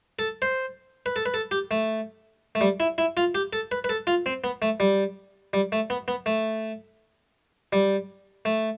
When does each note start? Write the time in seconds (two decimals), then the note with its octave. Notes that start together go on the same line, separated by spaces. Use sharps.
0.19 A4
0.42 C5
1.06 B4
1.16 A4
1.26 B4
1.34 A4
1.51 G4
1.71 A3
2.55 A3
2.61 G3
2.80 E4
2.98 E4
3.17 F4
3.35 G4
3.53 A4
3.72 B4
3.84 B4
3.89 A4
4.07 F4
4.26 C4
4.44 B3
4.62 A3
4.80 G3
5.53 G3
5.72 A3
5.90 B3
6.08 B3
6.26 A3
7.73 G3
8.45 A3